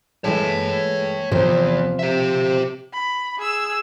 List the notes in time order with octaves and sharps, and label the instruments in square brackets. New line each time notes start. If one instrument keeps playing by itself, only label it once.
[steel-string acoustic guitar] E3 G#3 A3 [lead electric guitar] C#5 A5
[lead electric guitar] E2 G#2 [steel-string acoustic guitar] C3 F3 C5
[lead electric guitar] G4 E5
[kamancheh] B5
G#4 E6